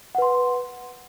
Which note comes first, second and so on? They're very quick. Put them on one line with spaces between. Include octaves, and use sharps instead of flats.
F#5 B4 C6